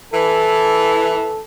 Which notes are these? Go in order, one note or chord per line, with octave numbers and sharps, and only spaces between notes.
E3 A4